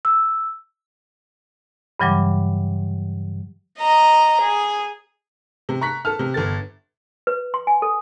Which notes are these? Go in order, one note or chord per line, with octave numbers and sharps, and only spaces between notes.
E6
G2 C#3 E3 F#3 G3 D6
D#5 A#5
G#4
C3
A#5 C#6 F#6 B6
A4 A5 F6
C3
G1 A4 A6
B4
C6
G#5
A4